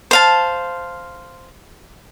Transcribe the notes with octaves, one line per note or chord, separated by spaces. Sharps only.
C5 F5 A5